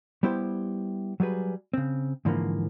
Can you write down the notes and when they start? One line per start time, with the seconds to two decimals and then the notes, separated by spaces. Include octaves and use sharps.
0.23 G3 B3 E4 G4 C5
1.20 F#3 G3 G#4 B4
1.74 C#3 C4
2.25 G#2 D3 E3 F3 A#3